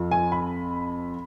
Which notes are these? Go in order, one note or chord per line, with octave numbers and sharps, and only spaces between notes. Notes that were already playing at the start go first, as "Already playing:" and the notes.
Already playing: F2 F3
G#5
B5